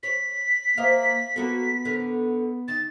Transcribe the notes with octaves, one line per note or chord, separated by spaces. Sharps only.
C#5 B6
A#3 C5 D#5 F5
A#3 B3 F#4 A4
D3 A#4
D#3 A6